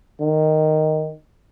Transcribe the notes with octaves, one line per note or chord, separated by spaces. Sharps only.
D#3